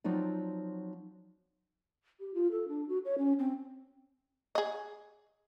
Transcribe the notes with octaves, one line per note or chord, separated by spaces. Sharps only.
F3 F#3 C4 D#4 D5
G4
F4
A4
D4
F#4
C#5
C#4
C4
G#4 D#5